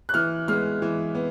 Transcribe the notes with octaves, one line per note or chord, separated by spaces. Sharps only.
F#6
E3 F6
G#3 B3 F6
E3
B3